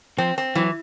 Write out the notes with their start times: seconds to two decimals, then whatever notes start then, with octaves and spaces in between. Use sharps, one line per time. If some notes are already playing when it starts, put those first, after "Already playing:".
0.18 F3 C4
0.38 C4
0.55 E3 F#3